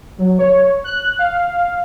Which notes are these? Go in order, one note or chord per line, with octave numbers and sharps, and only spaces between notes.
F#3
C#5
F#6
F5